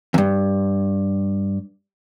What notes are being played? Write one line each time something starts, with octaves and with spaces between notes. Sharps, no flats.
E2 G2